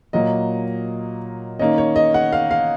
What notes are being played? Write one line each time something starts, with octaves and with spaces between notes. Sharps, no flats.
A#2 F#3 A#3 D#5
D#3 A#3 C#4 D#5
C#5
D#5
F#5
F5
F5